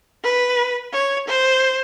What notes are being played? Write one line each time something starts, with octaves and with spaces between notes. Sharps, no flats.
B4
C#5
C5